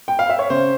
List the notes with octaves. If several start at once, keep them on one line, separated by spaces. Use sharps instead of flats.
G5
F5
E5
C#5
C#3 C5